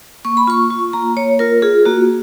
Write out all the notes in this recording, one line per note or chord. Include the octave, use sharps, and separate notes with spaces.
A#3 C#6
B5
F4 C#6
F4
A#3 A#5
A#3 C#5
F4 A#4
F4 G#4
A#3 F#4